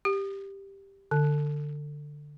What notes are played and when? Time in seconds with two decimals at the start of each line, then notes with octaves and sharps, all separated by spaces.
0.05 G4
1.11 D3